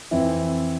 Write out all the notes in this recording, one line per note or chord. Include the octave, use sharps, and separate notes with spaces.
F2 E3 C4 E4